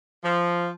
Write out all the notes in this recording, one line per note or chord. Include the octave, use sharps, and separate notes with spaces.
F3